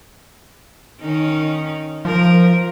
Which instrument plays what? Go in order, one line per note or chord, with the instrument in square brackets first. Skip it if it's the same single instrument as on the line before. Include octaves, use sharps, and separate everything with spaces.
[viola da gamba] D#3 C#4 D#4
[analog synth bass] F3 [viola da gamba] A#4